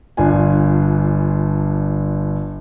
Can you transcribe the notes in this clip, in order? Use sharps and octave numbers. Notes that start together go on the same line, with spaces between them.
G1 D4 F4 G#5